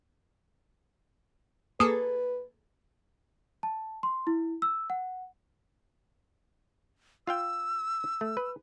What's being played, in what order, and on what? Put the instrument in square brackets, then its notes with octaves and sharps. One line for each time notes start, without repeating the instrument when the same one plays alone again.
[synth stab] A#3 G#4 A4 [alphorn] B4 [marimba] D#6
[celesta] A5
C6
E4
E6
F#5
[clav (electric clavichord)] F4 F5 G5 [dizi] E6
[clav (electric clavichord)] A3
B4